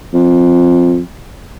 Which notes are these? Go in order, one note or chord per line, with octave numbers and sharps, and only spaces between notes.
F2